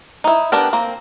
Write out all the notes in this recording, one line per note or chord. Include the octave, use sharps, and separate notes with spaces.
D#4 E4
B3 D4 G4 A#4
A#3 C4